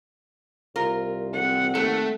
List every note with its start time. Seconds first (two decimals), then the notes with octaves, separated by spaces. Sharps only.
0.76 C2 F4 A#4
1.34 C4 F#5
1.75 D#2 A3 A4